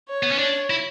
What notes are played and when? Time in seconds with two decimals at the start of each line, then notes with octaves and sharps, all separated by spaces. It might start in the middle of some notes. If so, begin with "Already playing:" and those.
0.09 C#5
0.23 B3
0.31 C#4
0.38 D4 C#5
0.70 E4